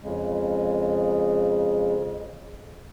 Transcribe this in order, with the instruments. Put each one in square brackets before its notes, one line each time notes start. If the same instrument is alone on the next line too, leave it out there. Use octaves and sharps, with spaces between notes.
[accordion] F2 C#3 G#3